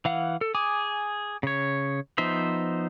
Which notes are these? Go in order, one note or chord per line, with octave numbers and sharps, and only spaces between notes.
E3 F5 F#5
A4
G#4 G#5 D6 D#6
C#3 C#5
F3 B3 D#4 C5 E5